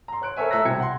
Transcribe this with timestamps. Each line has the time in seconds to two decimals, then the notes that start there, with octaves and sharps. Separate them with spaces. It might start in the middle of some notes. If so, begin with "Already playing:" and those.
0.08 A#5 C6
0.22 C#5 F#6 D7
0.36 A4 A#4 C5 C#5 E5 G#5
0.51 A3 A4 E5 A#5 F#6 A#6
0.65 B1 C3 G3 G5 G#6 C#7
0.80 F#5 C6